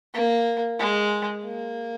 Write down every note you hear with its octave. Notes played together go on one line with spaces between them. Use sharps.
A#3
G#3
A#3